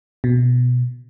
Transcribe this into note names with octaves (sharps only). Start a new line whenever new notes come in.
B2